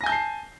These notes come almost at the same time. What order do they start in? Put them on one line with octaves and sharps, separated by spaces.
A#6 G#5 G6 A5 C7